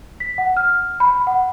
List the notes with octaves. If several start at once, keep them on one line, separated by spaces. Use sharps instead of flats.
B6
F#5
F6
B5
F#5